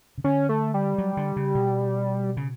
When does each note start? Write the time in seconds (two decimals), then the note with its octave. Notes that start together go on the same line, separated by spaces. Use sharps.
0.18 C#3
0.24 D3 C#4
0.49 A3
0.74 G3
0.98 F#3
1.17 D3
1.36 C#3
1.55 B2
2.37 C#3